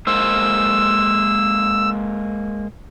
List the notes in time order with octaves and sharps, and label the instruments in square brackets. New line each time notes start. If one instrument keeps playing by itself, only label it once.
[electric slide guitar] G#3 A#3 C5 [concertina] E6